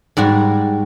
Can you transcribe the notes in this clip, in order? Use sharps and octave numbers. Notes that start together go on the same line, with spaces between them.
G#2 G3 F#4 G#4